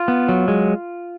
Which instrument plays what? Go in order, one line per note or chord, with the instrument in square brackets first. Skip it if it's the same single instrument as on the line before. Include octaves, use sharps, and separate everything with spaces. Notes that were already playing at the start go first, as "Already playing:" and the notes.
Already playing: [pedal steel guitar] F4
B3
F#3
G#3